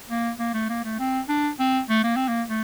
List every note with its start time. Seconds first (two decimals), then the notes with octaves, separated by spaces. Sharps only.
0.10 A#3
0.39 A#3
0.54 A3
0.70 A#3
0.84 A3
0.99 C4
1.29 D4
1.60 C4
1.89 A3
2.04 A#3
2.16 C4
2.28 A#3
2.49 A3